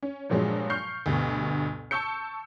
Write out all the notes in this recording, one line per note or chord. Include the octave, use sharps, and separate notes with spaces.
C#4
G2 A#2 F3 F#3 G#3
C#6 F6 G6 C7
D2 G2 B2
A5 C#6 E6 G6 C#7